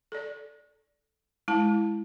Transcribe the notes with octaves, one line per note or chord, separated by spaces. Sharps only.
A4 D5
G#3 E4 A5